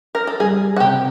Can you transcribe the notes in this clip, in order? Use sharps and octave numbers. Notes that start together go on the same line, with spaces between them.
A#4
A4
G3 G#4
F#4
C3 G4